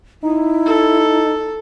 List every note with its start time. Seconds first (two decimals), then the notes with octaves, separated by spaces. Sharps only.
0.23 D#4 E4
0.66 A4